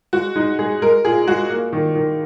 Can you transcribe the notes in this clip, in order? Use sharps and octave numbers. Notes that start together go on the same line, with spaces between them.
G#3 F#4
G#3 D#4
G#3 G#4
G#3 A#4
A#2 G#4
G#3 F#4
A#3
D#3
D#3